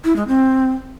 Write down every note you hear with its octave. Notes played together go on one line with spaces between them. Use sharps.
E4
G#3
C4